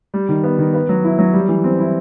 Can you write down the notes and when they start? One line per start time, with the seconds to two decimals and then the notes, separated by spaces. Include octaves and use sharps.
0.14 G3
0.29 D#3
0.44 B3
0.59 D#3
0.74 B3
0.89 F#3
1.04 E4
1.19 F#3
1.33 G3
1.49 E3
1.64 C4
1.79 E4